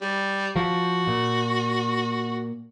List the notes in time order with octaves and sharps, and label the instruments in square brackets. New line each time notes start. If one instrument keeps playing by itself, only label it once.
[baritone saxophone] G3
[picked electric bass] F3 [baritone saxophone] F#4
[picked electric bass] A#2